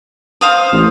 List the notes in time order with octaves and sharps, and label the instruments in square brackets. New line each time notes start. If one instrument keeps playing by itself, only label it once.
[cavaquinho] C5 F5 D#6
[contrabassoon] A1